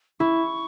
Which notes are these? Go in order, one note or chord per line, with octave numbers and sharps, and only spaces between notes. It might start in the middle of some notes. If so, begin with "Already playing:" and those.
E4 C#6